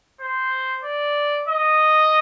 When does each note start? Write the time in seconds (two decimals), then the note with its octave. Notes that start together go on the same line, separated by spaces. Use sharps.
0.21 C5
0.84 D5
1.48 D#5